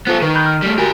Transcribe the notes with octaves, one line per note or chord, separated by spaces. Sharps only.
B3 F4 A4 C5 F#6
D#3 B4 C#6
B5 F#6 G6
F6
G3 A3
F#4 G4 A#4 G#5